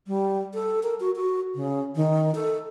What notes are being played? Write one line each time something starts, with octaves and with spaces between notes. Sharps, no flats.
G3
A4
A#4
F#4
F#4
C#3
D#3
A4